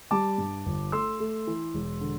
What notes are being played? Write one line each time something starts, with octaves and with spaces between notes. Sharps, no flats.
G3 A5 D6
G2
G1
A3 C6 E6
A3
E3
E1
D3